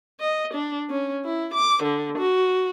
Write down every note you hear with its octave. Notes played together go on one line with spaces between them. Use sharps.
D#5
D4
C#4
E4
D6
D3
F#4